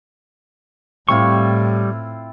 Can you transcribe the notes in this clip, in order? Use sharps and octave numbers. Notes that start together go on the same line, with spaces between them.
A2 G3 C4 E4 F4 C#6